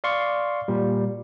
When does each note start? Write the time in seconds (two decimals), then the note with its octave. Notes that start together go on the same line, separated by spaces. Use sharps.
0.04 D5 F5 C6 C#6
0.68 A#2 G3